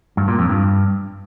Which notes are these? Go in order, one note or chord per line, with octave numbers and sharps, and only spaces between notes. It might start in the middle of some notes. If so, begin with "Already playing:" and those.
G2
A#2
F2
G2